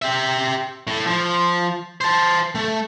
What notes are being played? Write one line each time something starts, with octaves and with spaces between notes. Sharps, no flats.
G4 E5
A2
F3
C5 A5
A3